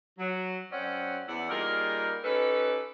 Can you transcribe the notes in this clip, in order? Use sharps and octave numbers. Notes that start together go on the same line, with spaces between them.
F#3
F#2 C4 C#4 D5 F#5
E2 D5 E5 F#5
G3 A#3 D#4 F4 G#4 A#4
C#4 D#4 G4 A4 B4